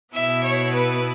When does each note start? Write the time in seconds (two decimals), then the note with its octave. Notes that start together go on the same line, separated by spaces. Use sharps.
0.14 B2 B3 E4 E5
0.44 C#5
0.73 B4